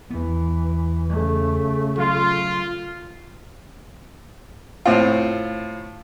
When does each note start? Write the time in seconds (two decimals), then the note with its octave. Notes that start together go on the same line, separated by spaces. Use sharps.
0.10 E2 E3 B3
1.10 C#3 A3
1.98 F#3 F4
4.86 A2 C4 F4